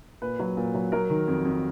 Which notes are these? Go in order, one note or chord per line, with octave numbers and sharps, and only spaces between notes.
A#2 B4
F#3
A#2
F#3
F#3 A#4
D#3
F2
F2